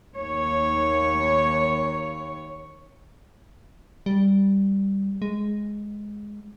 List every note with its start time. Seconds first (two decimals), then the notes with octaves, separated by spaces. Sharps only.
0.15 D#2 C#5
4.06 G3
5.22 G#3